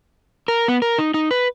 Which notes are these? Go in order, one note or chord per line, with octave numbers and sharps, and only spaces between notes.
A#4
B3
A#4
D#4
D#4
B4